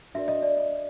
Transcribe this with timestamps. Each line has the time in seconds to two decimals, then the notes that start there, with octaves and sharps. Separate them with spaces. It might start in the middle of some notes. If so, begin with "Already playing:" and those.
0.14 D4 F#4 A#4 D5 E5
0.28 D#5
0.42 D5
0.57 D#5